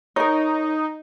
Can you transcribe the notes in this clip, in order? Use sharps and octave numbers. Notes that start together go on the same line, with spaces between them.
D#4 A#4 C#5